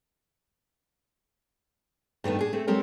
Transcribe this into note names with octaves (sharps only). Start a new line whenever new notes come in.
G2 D#3 A3 B3
D4 G#4
A3 C4
F#3 G#3 C4 G4 A4 A#4